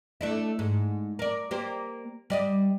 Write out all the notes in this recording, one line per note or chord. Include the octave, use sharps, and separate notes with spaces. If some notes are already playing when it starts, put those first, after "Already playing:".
A3 D4 E4
G#2
A#4 D5
A#3 G4 C5
G3 D5 D#5